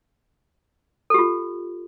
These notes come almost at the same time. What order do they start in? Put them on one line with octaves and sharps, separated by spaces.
A4 G4 F4